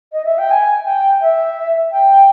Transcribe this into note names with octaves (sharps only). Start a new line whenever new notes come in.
D#5
E5
G5
G#5
G5
E5
G5